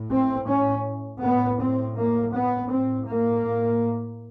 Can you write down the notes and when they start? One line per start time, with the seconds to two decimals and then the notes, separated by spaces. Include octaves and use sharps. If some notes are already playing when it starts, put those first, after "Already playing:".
Already playing: A2
0.11 C4
0.48 C#4
1.21 A2 B3
1.58 C4
1.96 A#3
2.33 B3
2.70 A2 C4
3.07 A#3